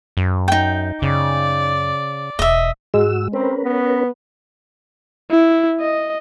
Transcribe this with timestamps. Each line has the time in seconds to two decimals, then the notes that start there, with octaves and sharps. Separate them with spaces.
0.17 F#2
0.48 D#4 G5
1.02 F#2 C#3 D5
2.39 E1 D#5 E5
2.94 G#2 G#3 F#4 E6
3.33 C4 C#4 A#4 B4
3.64 B3
5.31 E4
5.80 D#5